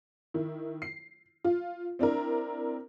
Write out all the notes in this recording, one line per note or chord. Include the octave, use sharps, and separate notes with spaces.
D#3 E4
C7
F4
C4 D4 E4 A#4